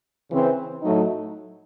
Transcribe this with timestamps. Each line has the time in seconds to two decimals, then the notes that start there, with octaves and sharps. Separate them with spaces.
0.30 C#3 E3 C4
0.83 A2 F#3 A3 D#4